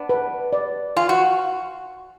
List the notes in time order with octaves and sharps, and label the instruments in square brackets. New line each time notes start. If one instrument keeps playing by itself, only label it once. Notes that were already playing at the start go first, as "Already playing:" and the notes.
Already playing: [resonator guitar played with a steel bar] B3 D4
[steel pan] B4
D5
[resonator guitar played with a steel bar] F4 [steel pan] G#5
[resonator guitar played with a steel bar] F#4